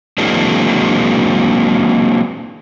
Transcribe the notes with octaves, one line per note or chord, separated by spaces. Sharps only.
E3 F#3 G#3 A#3 C4 D4